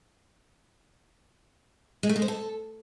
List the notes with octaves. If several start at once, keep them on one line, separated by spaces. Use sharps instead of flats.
G#3
A3
G#3
C5
A4